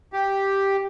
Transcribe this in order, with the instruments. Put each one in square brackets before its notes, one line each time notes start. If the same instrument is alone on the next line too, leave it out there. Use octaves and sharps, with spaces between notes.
[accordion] G4